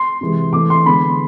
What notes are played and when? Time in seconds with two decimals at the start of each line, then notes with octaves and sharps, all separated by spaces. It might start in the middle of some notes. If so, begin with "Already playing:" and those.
Already playing: C6
0.21 C3 E3 G#3
0.53 E3 A3 C4 D6
0.70 C6
0.86 D3 G#3 B3 B5